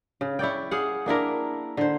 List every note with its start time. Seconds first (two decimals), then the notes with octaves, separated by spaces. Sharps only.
0.21 C#3
0.39 E4 C#5 D5 G5
0.71 G#4 F5 F#5
1.06 A#3 D4 E4 A#4
1.77 D3 C5